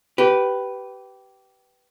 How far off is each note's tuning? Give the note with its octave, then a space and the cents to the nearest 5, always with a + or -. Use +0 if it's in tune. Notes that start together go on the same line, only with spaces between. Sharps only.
G4 -20 B4 +0